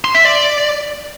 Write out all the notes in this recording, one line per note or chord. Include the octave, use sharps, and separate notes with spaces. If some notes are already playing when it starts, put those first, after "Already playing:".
C6
E5
D5